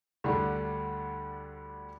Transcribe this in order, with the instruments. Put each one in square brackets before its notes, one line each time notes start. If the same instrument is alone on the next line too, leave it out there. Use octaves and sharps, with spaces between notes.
[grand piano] D2 D3 G3 D4